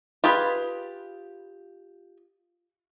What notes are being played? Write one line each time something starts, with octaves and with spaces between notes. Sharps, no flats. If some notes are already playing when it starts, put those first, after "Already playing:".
F4 G4 G#4 B4